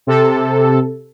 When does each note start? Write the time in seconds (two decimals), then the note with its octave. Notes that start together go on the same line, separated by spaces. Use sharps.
0.07 C3 A4